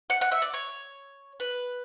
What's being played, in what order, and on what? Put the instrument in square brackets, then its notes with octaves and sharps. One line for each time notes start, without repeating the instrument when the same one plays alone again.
[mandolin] F#5
F#5
E5
D5
C#5
B4